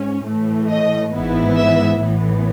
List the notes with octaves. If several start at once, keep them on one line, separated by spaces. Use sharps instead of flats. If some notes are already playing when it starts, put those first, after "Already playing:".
Already playing: G#2 C#4
A2 E3 A3
D#5
G#1 G#2 E3 B3 E4
E5
A1 A2 E3 B3